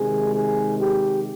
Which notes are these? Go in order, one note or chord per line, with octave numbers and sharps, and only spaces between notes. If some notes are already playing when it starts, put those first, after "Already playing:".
Already playing: C3 D#3 G#3 G#4
G#4
G4